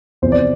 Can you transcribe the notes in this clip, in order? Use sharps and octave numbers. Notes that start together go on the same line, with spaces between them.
E2 C3 F3 C5
D5